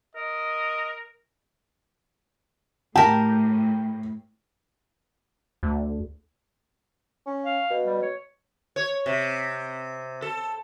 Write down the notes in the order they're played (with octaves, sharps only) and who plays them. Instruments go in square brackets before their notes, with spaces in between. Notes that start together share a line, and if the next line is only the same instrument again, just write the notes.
[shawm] A#4 [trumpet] D#5
[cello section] A2 [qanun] G4 A#4 [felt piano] G5 [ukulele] A5
[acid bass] D2
[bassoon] C#4
[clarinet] F5
[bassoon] B2
[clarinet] G3
C#5
[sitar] C#5
C3
A4